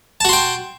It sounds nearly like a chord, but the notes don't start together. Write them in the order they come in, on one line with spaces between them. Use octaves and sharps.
A5 F#4 C6 G5